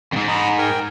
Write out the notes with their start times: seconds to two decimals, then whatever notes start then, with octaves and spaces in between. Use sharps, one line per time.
0.13 F2 G#2
0.28 D#4 A#5 B5
0.58 A#4 G5 G#5